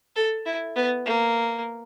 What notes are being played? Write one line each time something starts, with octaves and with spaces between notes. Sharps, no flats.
A4
E4
B3
A#3